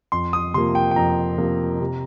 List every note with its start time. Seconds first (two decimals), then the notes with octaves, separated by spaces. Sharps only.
0.12 F2 C6
0.33 D#6
0.54 C3 F3 A#3 C6
0.75 G5
0.91 G5
0.96 F2 A#5
1.38 C3 F3 A#3
1.80 C3